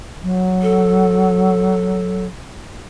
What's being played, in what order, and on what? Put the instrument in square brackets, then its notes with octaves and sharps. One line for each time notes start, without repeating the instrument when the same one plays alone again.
[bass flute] F#3
[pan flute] A4